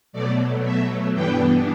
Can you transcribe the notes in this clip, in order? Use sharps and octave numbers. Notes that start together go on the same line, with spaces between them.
B2 F#3 A3 D5
E5
G2 E3 B3 D4 G5